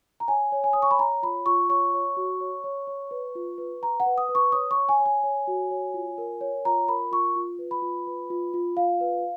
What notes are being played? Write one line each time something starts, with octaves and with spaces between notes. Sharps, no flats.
A#5
C#5 G#5
C#5
G#5
C#5 D#6
C#6
B5
C#5 A#5
F4 B5
F4 C#6
C#5 C#6
C#5
F#4
C#5
C#5
C#5
B4
F4
B4
B4 A#5
F#5
B4
D#6
B4
C#6
C#5 D#6
C#6
C#5
G#5
C#5
G#5
C#5
F#4
C#5
F4
A#4
C#5
F4 A#5
A#4 B5
F4 C#6
F4
B4
B5
F4
B4
F4
F4
F4 F5
B4